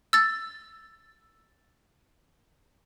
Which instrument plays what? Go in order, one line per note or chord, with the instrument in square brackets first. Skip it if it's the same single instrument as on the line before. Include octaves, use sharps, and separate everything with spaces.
[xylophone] E6 A6